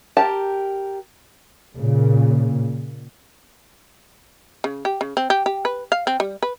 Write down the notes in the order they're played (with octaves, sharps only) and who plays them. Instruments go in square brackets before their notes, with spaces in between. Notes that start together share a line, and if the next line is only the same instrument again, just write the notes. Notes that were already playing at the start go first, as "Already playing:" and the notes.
[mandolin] G4 A#4 [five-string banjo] A5
[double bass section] A#2 C#3
[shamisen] C#3
G4
C#3
C4
G4
G4
B4
F5
C4
G3
B4